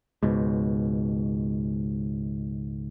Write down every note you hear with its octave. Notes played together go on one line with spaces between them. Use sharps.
C#2 G#2 B2